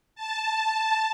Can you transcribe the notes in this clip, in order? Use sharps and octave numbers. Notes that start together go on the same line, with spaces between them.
A5